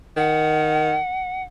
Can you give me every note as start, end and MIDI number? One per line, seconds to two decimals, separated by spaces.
0.17 0.97 51
0.17 1.43 78